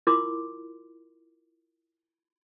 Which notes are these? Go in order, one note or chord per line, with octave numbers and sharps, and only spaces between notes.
E4 F4 A#4 C6 D6